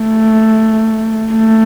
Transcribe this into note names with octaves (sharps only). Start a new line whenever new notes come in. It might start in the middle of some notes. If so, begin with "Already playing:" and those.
Already playing: A3
A3